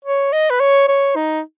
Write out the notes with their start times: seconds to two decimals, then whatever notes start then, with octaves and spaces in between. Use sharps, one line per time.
0.05 C#5
0.32 D#5
0.50 B4
0.60 C#5
0.88 C#5
1.15 D#4